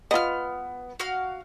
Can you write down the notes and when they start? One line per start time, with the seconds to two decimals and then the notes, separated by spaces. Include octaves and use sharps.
0.11 B3 F4 D#5 F6
1.00 F#4 F5 F6